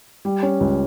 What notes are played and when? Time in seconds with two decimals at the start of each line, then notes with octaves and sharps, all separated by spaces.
0.25 G3
0.43 C#4
0.60 C#2